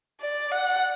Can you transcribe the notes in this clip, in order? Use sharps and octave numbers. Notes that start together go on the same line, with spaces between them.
D5
F#5